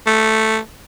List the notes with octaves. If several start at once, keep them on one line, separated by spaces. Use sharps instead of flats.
A3